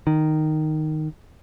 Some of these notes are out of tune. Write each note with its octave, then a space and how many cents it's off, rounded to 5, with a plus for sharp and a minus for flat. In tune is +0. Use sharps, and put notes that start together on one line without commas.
D#3 -5